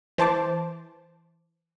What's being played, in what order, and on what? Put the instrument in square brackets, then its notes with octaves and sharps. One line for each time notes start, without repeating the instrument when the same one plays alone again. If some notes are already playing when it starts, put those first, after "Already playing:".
[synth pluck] E3 C5 A5 D6